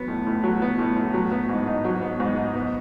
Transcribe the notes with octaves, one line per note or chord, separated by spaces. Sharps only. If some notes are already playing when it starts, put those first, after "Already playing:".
Already playing: F#3 B3
A2
A2
F#3
B3
A2
A2
F#3
B3
G#2
D#4
F#3
B3
G#2
D#4
B3